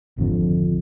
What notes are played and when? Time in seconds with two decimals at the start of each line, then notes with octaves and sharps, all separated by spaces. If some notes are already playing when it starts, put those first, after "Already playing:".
0.18 G#1 F2 D3